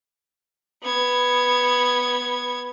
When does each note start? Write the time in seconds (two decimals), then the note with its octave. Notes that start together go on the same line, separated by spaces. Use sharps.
0.83 B3 G#6